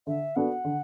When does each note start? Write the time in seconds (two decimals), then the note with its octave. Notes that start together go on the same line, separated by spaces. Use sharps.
0.07 D3 E5
0.36 B3 D4 F#4 A4 F#5
0.65 D3